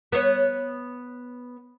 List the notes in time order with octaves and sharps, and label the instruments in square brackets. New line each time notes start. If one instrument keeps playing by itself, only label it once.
[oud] B3 C#5